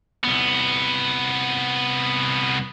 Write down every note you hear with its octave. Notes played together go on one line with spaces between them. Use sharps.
C2 B3